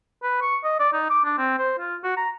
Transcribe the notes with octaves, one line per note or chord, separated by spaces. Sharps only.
B4
C#6
D#5
D5
D#4
D6
D4
C4
C5
F4
F#4
A#5